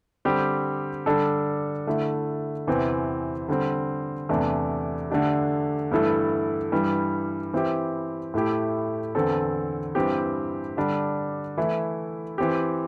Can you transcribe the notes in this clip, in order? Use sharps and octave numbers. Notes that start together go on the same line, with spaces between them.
D3 G3 C4 G4
D3 G3 D4 A4
D3 A3 E4
E2 C3 E3 C4
D3 G3 C4
E2 C3 A3 D4
D3 A3 D4 G4
G2 E3 A3 E4 A4
G2 E3 G3
E3 C4 E4 G4
A2 A3 E4 G4
E2 D3 C4 A4
G2 E3 C4 G4
D3 G3 D4
E3 A3 E4
E3 C4 G4